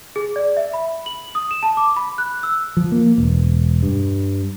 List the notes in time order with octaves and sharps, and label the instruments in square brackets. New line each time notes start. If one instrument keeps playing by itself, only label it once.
[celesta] G#4
D5
E5
B5
F#7
D#6
E7
A5
D6
B5
F#6
E6
[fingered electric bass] F3
A#3
E1
G2